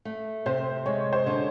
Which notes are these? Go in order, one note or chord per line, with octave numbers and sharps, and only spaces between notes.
A3
C3 C5
G#3 C#5
C5
D3